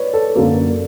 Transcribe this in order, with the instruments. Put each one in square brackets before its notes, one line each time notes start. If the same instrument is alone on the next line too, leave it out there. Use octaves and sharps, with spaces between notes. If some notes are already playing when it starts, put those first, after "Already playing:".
Already playing: [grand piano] B4 C#5 D5
A4
[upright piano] F#2 D3 F#3 A#3